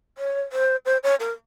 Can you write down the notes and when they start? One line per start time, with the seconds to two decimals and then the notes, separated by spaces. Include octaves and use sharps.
0.18 C#5
0.52 C5
0.85 C5
1.03 C#5
1.20 A#4